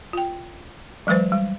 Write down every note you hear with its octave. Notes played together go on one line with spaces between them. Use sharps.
F4 G5
E3 F#3 G#3 B4 C5
G3